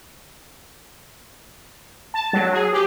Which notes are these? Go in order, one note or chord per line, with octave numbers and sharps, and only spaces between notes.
A5
F#3
G#4
G4